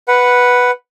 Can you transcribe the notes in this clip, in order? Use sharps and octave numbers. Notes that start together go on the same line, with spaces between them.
B4 F#5